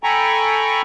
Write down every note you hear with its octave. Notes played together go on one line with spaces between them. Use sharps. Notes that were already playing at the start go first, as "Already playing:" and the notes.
A4 G5 G#5 A#5 B5 C#6